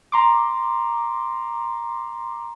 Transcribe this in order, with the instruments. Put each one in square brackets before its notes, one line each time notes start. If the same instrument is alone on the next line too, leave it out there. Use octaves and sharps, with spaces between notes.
[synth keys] A#5 C6 D6